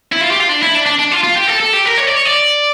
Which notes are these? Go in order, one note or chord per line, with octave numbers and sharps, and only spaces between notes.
E4
F4
G4
F4
D4
E4
D4
D4
D4
F4
F4
G4
A4
A4
G4
A#4
C#5
D5
C#5
D5